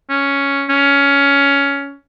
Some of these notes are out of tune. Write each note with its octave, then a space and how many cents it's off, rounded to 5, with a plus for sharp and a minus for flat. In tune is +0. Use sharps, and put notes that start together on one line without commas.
C#4 +5
C#4 +15